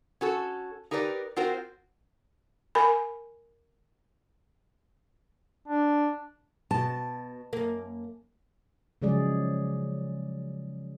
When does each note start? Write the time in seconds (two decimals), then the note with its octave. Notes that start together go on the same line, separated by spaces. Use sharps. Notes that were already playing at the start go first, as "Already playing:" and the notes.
0.21 C#4 F#4 A4
0.91 D#4 G4 A#4 B4 D5
1.36 C4 F4 F#4 A#4 C5
2.75 A#4 G#5 B5
5.68 D4
6.71 B2 A5
7.53 F#2 A#3
9.02 C#3 F3 F#3 G#3 G#4 D5